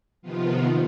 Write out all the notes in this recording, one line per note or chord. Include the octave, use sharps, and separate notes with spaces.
C3 D#3 F3 B3 F4